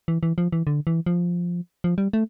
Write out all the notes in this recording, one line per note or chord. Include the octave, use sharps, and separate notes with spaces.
E3
E3
F3
E3
D3
E3
F3
F3
G3
A3